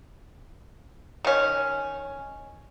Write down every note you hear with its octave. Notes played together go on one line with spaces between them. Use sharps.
D#3 C#4